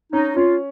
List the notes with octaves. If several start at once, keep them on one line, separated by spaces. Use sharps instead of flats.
C#4 D#4
C#4 F4